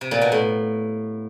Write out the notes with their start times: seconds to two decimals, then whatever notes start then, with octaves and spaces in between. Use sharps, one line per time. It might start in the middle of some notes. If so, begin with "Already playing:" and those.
0.01 C3
0.11 A#2
0.22 B2
0.32 A2